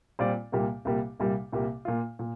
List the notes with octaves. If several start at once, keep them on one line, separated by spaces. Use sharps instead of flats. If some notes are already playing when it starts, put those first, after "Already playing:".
A#2 G3 C4 F4 D5
C2 A#2 G3 A#3 G4
C2 A#2 G3 A#3 G4
C2 A#2 G3 A#3 G4
C2 A#2 G3 A#3 G4
A#2 A#3 F4
A#2